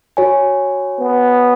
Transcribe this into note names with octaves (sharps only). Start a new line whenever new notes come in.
F#4 C#5 G#5
B3